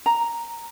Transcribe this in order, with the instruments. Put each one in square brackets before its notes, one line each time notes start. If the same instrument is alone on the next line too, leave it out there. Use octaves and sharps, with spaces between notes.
[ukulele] A#5